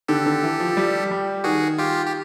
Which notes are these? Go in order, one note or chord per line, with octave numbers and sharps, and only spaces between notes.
D3 G4 A4
D3
E3
F3
G3
G3
D#3 F#4 G#4
F4 G4
G4